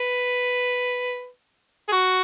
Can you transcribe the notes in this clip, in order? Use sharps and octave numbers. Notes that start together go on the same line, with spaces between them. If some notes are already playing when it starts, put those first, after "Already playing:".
Already playing: B4
G#4
F#4